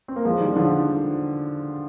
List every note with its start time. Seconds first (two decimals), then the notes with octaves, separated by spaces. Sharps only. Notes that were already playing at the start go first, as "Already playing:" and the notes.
0.08 C4
0.16 A#3
0.25 F3 G#3
0.40 D#3 G3
0.56 D3 F3